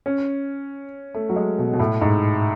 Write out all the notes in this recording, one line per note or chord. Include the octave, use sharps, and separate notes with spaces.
C#4
A3
F#3
G#3
B2
B2
A2
G#2